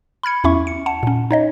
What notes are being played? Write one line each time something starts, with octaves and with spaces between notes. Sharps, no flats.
B5 F6 G#6 C#7
E2 C#4 E4 E5 C#6
C#7
F#5 A5 C#7
A#2 C#4
D#4 C#5 D#5